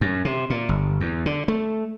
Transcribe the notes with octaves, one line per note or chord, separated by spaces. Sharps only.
F#2
C3
A#2
G1
E2
D3
A3